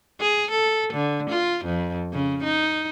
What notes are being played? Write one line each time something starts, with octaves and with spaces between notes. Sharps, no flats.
G#4
A4
D3
F4
F2
C#3
D#4